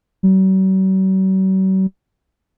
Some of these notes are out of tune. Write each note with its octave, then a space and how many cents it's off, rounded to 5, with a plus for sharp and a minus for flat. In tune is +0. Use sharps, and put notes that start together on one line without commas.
F#3 +45